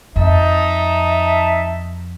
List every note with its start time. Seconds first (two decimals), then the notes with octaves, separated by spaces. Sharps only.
0.16 F2 D#4 E5 A5